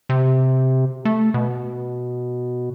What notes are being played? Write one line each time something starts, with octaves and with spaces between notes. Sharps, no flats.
C3
A3
B2